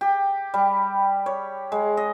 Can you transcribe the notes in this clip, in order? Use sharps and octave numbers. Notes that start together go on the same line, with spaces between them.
G4
G3
C#5
G#3
D#5